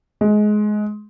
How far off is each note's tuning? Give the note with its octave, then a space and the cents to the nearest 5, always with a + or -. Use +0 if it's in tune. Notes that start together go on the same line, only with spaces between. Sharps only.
G#3 +20